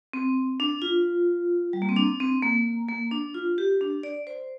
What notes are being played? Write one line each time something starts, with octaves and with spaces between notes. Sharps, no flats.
C4
D4
F4
G3
A#3
C4
D4
C4
A#3
A#3
D4
F4
G4
D4
D5
C5